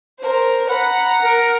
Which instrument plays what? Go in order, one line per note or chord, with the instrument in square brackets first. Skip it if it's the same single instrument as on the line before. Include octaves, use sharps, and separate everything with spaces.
[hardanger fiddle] A#4 C5
[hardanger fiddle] F#5 A#5 [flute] B5
[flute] A#4